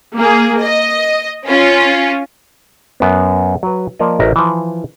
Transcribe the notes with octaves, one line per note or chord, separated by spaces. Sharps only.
A#3 G#4
D#5
C#4 F4
F#2 B3
F#3 B4
F3 A#3 A#4 D5 D#5
A1 A#4 D#5 E5 A#5
E3 F3